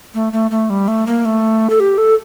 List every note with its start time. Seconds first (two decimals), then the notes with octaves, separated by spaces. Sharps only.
0.14 A3
0.33 A3
0.51 A3
0.70 G3
0.88 A3
1.07 A#3
1.25 A3
1.70 A4
1.80 G4
1.98 A4